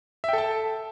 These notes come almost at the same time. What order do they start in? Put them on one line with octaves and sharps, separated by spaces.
E5 G5 A4 A5